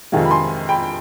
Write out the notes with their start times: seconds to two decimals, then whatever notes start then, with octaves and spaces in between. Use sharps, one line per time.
0.12 F2 C3 D#3 G#3 F5 G#5
0.25 B5
0.31 G#5 C6
0.69 G5 B5